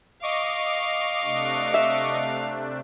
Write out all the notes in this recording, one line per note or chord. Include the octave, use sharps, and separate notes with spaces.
D#5 F5 C#6 D6
C3 A3 D4
E5